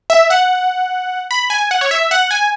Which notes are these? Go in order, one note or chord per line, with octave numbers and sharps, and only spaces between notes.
E5
F#5
B5
G#5
F#5
C#5
E5
F#5
G#5